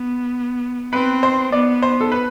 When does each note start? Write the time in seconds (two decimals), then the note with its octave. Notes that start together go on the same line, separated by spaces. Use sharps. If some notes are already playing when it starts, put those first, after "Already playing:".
Already playing: B3
0.93 C4 B4
1.23 C5
1.52 B3 D5
1.82 C5
2.01 A4
2.12 B4